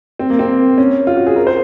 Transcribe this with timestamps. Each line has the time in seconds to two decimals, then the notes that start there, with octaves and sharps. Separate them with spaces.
0.19 C4
0.30 A#3
0.39 C4
0.78 C#4
1.07 F4
1.17 F#4
1.27 G#4
1.36 A#4
1.47 C5